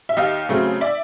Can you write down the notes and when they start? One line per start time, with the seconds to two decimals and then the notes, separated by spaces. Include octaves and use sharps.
0.09 E5
0.17 D#2 D#5 F5
0.49 C#3 F#3 A3 C4
0.81 D5 E5